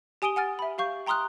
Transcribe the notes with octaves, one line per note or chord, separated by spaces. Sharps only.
G4 G#5 D#6 D7 D#7 G7
F#5 G#5 F6 A6
E5 B5
G4 F5 C#6 G6
G5 A#5 C6 D#6 F6 F#6